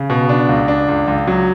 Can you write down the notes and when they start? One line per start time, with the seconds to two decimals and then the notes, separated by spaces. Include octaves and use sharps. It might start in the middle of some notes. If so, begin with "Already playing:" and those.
Already playing: C#3
0.10 B2
0.29 D4
0.49 C#2
0.68 D4
0.88 C#2
1.07 C#2
1.27 F#3